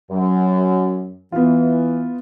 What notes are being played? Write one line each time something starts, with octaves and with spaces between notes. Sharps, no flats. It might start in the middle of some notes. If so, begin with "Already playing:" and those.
F#2
E3 B3 F4